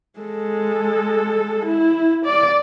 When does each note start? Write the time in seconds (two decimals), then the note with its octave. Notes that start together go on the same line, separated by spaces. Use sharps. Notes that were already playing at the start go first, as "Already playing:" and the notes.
0.20 G#3 A4
1.66 E4
2.26 D5